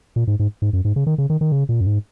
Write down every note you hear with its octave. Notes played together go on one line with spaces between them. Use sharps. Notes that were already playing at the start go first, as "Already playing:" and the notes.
A#2
G#2
G#2
G#2
F#2
G#2
C#3
D#3
C#3
D#3
D#3
C#3
A#2
F#2
G#2